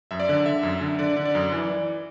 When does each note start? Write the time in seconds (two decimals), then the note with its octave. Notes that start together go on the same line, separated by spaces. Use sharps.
0.11 F#2 E5
0.20 D5
0.29 D3
0.46 D3 E5
0.63 F#2
0.81 D3
0.99 D3 D5
1.16 D3
1.25 D5
1.35 F#2
1.52 E3
1.70 E3